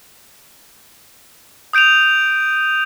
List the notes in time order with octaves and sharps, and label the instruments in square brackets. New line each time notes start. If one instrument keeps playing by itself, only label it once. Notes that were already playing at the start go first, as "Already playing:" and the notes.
[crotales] D#6 G6 D7 D#7 F7